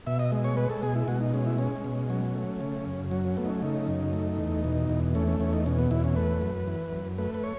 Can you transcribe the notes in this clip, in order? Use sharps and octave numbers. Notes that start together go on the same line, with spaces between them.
B2 E5
D#5
G#3
C#5
G#3 B4
A4
B2 G#4
E4
B2 F#4
D#4
G#3 C#4
E4
G#3 C#4
B2
F#3 C#4
A3
C#3
F#2
F#3 C#4
C#4
A3 B3
D#4
C#4
C#3 D#4
F#2
A3
E2
B2
E2
A3 C#4
C#4
E2 C#4
D#4
B2 C#4
B3
E2 E4
C#4
A3 B4
F#2
E3
F#2
A3 B4
B4
C#5